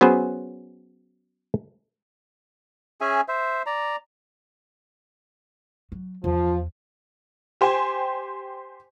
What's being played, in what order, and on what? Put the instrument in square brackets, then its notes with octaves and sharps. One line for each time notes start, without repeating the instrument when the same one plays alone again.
[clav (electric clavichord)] F#3 B3 C#4 G#4 B4 C5
[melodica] C#4 G#4 E5 G#5
C5 E5
D5 A#5
[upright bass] F#3
[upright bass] E2 [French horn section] F3
[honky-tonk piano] G4 C5 G5 G#5